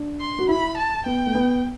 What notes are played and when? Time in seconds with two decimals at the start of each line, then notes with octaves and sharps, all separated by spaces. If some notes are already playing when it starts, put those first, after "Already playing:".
Already playing: D4
0.20 C6
0.39 F#4
0.48 E4 B5
0.78 A5
1.06 B3 G5
1.26 A3
1.35 B3